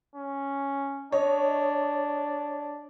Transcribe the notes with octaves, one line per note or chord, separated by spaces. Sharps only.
C#4
D4 C#5 D#5